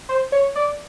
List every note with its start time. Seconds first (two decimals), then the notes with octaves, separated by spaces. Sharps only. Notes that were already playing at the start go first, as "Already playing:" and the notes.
0.09 C5
0.32 C#5
0.56 D5